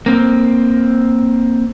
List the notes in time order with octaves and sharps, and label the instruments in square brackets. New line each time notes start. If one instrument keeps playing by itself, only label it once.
[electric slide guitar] A#3 C4